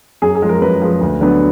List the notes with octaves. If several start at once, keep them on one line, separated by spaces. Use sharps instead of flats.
F#2 G#4
G#4
F3 G#3
A#4
F#2 B4
F3 G#3
D2
D3 F#3 B3